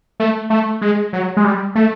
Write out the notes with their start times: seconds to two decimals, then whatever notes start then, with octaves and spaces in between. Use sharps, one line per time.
0.20 A3
0.50 A3
0.82 G#3
1.13 F#3
1.37 G#3
1.44 G3
1.75 A3